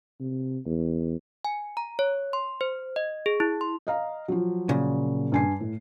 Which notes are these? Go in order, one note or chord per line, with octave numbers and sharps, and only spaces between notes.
C3
E2
G#5
A#5
C#5
C6
C5
D#5
G#4
E4
C6
D#5 F5 A#5
F3 F#3
A#2 C#3
G2 G#5 C7
A2